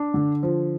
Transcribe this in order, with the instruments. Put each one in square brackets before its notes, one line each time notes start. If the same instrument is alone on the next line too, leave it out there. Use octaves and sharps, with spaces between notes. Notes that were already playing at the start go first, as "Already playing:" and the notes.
Already playing: [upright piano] D4
D3
F3